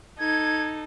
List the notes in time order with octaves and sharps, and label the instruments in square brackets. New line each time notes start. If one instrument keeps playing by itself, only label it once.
[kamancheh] D#4 A4 [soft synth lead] G#6